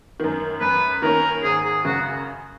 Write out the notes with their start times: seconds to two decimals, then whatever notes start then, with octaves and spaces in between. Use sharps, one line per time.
0.20 F#2 D#3
0.61 F#2 B4
1.02 D#3 A#3 C#4 A#4
1.43 G#1 G#4
1.64 G#4
1.85 F#2 C#3 F#4